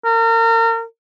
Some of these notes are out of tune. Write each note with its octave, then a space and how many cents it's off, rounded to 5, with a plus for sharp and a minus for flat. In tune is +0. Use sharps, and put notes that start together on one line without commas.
A#4 -35